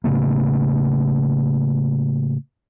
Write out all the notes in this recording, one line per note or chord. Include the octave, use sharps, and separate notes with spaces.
A2 C#3 A3 A#3